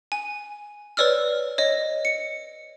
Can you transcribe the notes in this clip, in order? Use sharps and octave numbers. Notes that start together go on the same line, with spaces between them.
G#5
B4 C#5 D5 E6 F6
C#5 D#5
C#7